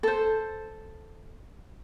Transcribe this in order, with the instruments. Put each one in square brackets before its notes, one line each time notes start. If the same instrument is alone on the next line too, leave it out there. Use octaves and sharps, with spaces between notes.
[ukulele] A4 C5